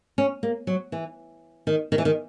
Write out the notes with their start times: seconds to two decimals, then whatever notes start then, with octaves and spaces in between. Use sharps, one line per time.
0.18 C#4
0.43 A#3
0.67 F#3
0.92 E3
1.67 D#3
1.92 D#3
1.98 E3
2.05 D#3